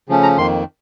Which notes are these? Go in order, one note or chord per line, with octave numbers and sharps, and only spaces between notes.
C#3 F3 A3 C#4
A#5
F2 D#3 A#3 C6